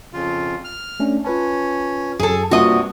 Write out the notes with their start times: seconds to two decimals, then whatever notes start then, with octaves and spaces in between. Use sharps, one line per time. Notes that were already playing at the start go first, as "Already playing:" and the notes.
0.14 F2 C#3 F4
0.64 F6
1.00 A3 C#4 D4
1.25 C#4 F4 B4 A5
2.20 F#2 F#3 G#4 A4
2.51 G2 C3 G3 A#3 F4 F#4 D#5